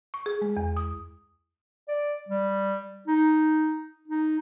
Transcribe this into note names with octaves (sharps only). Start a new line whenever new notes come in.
C#6
G#4
G#3
E2
D#6
D5
G3
D#4
D#4